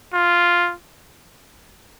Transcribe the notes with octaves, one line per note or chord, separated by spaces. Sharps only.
F4